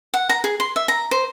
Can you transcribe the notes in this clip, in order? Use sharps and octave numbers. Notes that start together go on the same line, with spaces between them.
F#5
A#5
G#4
C6
E5
A#5
C5